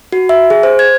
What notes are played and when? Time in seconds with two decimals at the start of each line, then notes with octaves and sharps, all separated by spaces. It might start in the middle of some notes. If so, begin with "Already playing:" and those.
0.12 F#4
0.29 E5
0.50 G#4
0.63 C5
0.79 G#6